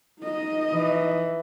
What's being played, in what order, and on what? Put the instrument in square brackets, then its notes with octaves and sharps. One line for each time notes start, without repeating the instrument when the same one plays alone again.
[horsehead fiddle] D#4 D#5
[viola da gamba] E3